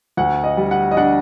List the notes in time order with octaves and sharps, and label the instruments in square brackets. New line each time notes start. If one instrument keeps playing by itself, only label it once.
[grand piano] D2 F#5
D#5
G3
F#5
D#5
D4 F#5